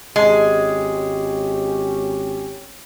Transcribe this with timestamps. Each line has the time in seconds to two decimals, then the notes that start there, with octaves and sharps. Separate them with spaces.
0.16 G#1 G#3 C#4 G4